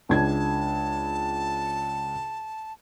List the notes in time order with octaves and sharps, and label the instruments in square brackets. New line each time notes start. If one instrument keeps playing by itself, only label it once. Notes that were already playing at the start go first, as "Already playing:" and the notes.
[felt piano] C#2 D4 G#6 [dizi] A5